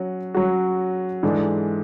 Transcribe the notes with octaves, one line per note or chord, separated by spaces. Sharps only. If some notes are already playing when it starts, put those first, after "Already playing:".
Already playing: F#3 C#4 F#4
F#3 C#4 F#4
G#2 E3 G#3 D4 A4